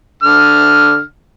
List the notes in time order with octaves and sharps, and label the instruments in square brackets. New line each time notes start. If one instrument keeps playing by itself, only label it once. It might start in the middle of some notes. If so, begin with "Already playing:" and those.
[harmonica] D3 F6